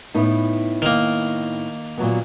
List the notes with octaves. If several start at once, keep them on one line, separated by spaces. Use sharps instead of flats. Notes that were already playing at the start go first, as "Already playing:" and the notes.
A2 B3 D#4
D#3 A#3
A#2 F#3 B3